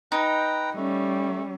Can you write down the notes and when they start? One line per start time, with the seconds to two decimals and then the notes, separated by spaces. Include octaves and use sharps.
0.12 D#4 B4 G5 A#5
0.76 G3 A3 C#4